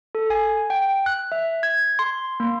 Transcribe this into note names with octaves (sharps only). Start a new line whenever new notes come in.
A4
G#5
G5
F#6
E5
G#6
C6
A#3